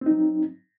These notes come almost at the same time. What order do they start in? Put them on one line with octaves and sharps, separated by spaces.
C4 D#4 F#3